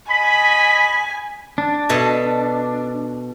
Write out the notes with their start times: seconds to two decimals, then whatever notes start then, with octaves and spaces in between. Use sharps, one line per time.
0.10 D#5 G#5 B5 B6
1.58 D4
1.89 B2 A4 D#5